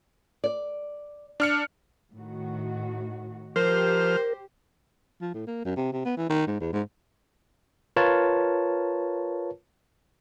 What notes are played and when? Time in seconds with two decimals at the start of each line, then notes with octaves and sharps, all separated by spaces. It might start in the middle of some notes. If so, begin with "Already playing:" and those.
0.44 D5
1.40 D4 F6 C#7
2.15 A2 D#3 F#4
3.56 F3 G4 A#4 C5 F6
5.21 F3
5.34 A2
5.47 A#3
5.65 F#2
5.76 C3
5.93 C3
6.05 B3
6.17 E3
6.30 D#3
6.47 G#2
6.61 E2
6.73 G#2
7.96 F4 A#4 B4 C#5 A5